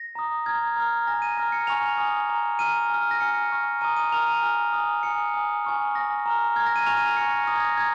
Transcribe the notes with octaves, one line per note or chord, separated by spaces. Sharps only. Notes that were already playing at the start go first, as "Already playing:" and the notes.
Already playing: A#6
A#5 D#6
A#5 F6 G#6
A#5 F6
G#5 F6 A#6
D#7
A#5 F6 A#6
C#7
G#5 C#6 F6 F7
G#5 D#6
A#5 F6
A#5 F6 D#7
G#5 F6
A#6
G#5 F6 C#7
G#5 C#6 F6
A#5 D#6 D#7
D#7
A#5 F6 F7
D#7
G#5 F6
G#5 D#6
G#5 D#6 C#7
G#5 D#6
G#5 C#6 F6
G#5 D#6 A#6
A#5 F6
A#5 F6 G#6
A#6
D#7
G#5 C#6 F6 F7
D#7
A#6
G#5 C#6 F6 C#7
A#6
A#5 D#6 A#6
G#6
A#6
A#5 D#6 G#6